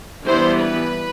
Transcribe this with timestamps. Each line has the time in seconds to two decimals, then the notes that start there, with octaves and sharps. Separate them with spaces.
0.25 E3 G3 B3 D4 C5
0.62 B4